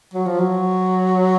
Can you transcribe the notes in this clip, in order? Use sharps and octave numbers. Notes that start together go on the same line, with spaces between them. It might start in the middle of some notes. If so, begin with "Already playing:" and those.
F#3
F3
F#3